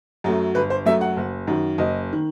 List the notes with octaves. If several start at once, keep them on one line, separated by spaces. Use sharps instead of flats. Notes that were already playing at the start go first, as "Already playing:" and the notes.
F#2 F#3 A3
G1 B4
C5
F#2 F#3 A3 E5
F#5
F#1
F#2 D#3
F#1 D#5
D#3